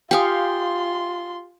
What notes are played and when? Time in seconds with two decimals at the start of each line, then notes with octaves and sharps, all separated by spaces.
0.11 F4 G4 F5 G5 G#5 C6 D#6